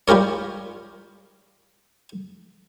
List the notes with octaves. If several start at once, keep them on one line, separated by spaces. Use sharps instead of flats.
G3 F4 G4 A#4 C#5